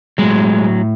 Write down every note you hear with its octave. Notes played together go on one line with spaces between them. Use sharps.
A2 F#3 G#3